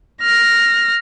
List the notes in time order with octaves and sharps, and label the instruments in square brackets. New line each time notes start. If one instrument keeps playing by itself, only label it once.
[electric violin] F6 A#6